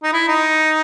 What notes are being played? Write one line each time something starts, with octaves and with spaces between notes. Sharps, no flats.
D#4
E4
D#4